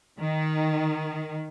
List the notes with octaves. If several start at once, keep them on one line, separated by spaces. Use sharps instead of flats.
D#3